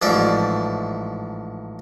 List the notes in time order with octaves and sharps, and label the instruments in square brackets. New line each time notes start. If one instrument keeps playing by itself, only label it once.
[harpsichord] A1 G#2 F3 D5 E5 C#6